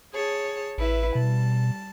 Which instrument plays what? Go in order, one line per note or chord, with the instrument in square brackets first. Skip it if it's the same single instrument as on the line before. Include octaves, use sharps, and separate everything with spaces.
[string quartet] G#4 C#5 A5
[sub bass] A1 [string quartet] E4 B4 E5
[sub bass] B2 [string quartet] G3 A5